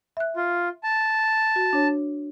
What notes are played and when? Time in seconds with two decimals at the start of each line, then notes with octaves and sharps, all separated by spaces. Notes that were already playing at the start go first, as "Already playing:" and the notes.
0.17 E5 F#6
0.36 F4
0.83 A5
1.56 F#4
1.73 D4 C#5